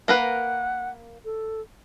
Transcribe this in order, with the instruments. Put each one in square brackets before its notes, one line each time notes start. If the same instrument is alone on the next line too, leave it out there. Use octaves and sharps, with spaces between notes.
[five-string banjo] A#3 A#4 B4 [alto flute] F#5
[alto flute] A4